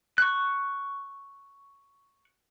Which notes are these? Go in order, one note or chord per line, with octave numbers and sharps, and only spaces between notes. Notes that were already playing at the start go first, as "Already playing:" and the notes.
C#6 F#6